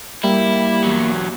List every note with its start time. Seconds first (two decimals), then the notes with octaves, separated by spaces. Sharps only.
0.23 G3 A#3 E4
0.84 E2 F#3